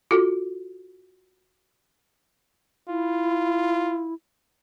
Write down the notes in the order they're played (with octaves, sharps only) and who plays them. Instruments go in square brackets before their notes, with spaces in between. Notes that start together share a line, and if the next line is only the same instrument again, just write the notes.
[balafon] F4 F#4 A4
[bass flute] E4 [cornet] F4